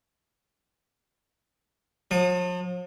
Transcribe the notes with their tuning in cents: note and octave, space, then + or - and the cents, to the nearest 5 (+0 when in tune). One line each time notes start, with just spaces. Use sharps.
F3 +45 D#6 -25